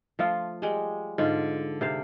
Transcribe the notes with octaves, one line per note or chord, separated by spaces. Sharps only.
F3 A3 F4
G3 G#3
G#2 D3 F4
C3 C5 F5